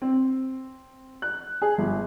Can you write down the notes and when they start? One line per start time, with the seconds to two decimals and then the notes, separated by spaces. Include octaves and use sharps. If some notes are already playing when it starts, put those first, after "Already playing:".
0.02 C4
1.22 F#6
1.62 G#4
1.78 G1